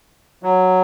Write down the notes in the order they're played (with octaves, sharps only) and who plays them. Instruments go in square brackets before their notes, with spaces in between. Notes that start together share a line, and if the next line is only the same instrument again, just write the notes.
[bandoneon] F#3